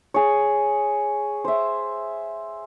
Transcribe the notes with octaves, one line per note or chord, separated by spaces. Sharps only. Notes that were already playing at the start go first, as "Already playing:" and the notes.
G#4 C#5
C5 E5